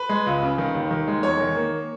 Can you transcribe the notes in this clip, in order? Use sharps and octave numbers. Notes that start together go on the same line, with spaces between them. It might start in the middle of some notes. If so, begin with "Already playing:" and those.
Already playing: B4
G#3
C#2
C#3
D#3
D#2
D#3
G#3
E2 C#5
D#3
A#3